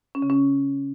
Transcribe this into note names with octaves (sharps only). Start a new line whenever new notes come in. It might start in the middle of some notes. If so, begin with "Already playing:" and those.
C#4
C#3
C#4